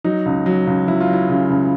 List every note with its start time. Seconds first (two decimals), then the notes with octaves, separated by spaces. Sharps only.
0.04 F#3 D#4
0.26 C#2
0.46 F#3
0.67 C#2
0.88 F#3 E4
1.00 F4
1.08 F#3 E4
1.30 C#3
1.50 C#2